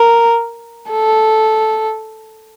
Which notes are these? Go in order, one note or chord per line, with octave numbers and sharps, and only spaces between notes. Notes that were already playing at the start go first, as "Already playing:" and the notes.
Already playing: A#4
A4